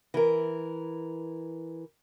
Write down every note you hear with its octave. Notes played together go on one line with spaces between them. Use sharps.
E3 A#4